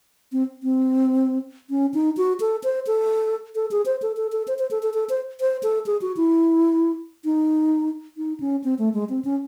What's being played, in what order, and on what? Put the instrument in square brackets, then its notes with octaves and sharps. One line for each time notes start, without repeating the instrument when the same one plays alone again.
[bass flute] C4
C4
C#4
D#4
F#4
A4
C5
A4
A4
G#4
C5
A4
A4
A4
C5
C5
A4
A4
A4
C5
C5
A4
G#4
F#4
E4
D#4
D#4
C#4
C4
A3
G#3
C4
C#4